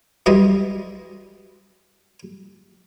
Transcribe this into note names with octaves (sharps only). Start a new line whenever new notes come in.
F#2 E3 G3 G#3 D#5 C6